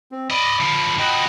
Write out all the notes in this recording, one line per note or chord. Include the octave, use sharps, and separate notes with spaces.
C4
D5 D#5 B5
D3 F3
F3 F#4 D#5 G5 B5